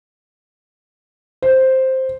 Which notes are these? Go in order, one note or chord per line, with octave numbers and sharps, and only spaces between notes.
C5